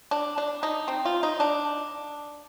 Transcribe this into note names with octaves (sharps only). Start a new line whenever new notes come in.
D4
D4
D#4
C4
F4
D#4
D4